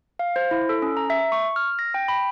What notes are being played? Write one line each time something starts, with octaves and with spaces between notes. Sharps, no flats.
F5
C5
E4
A4
C#4
A#5
E5
C#6
F6
A#6
G5
B5